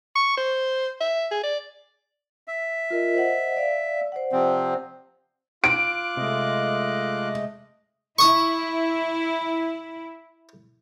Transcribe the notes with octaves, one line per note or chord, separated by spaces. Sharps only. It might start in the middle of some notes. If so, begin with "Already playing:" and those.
C#6
C5
E5
G#4
D5
E5
F4 A#4 D#5
C5 D#5 F#5
D5 F5
C5 D5 F#5
C3 F3 C4
F4 D6 F#6 D7
C3 G#3 A3 D#5
E4 C#6 D#6